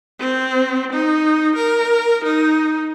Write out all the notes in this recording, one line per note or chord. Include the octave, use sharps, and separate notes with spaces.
C4
D#4
A#4
D#4